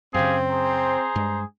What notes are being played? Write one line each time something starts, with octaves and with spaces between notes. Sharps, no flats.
F#2 C#3 C4 G4 G#4 F5
G#4 C5 A#5
G2 G#3